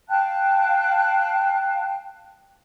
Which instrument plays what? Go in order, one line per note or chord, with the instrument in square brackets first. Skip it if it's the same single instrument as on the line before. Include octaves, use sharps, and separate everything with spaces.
[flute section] F5 G5 A5 F#6